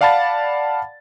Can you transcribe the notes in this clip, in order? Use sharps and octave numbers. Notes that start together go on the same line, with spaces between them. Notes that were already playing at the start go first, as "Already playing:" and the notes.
D5 F5 F#5 A5 B5 A6